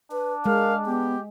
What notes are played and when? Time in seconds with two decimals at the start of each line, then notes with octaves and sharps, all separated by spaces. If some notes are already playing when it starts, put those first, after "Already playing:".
0.12 D4 B4
0.46 G#3 A#4 F5
0.86 B3 G4